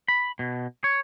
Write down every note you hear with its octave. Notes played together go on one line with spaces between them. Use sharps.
B5
B2
C#5